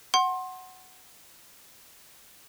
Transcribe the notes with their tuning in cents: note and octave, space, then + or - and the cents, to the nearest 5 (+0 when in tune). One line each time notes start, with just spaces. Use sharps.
F#5 +5 C6 +25